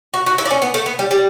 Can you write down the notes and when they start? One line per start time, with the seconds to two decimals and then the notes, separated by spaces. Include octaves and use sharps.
0.14 F#4
0.26 F#4
0.38 E4
0.45 D4
0.51 C#4
0.62 B3
0.74 A3
0.86 B3
0.99 G3
1.11 G3